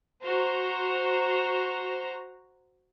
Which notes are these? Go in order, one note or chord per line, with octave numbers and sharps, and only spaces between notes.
F#4 C5 A#5